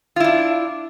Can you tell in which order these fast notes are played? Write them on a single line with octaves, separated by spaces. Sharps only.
F4 E4 D4